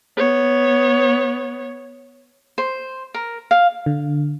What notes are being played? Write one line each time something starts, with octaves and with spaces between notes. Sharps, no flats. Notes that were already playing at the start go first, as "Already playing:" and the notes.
B3 C#5
C5
A#4
F5
D3